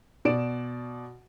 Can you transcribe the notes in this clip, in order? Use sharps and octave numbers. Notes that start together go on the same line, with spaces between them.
B2 D5 D7 E7